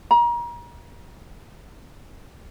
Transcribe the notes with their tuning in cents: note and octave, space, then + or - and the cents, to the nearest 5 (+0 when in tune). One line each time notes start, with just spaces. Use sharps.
A#5 +35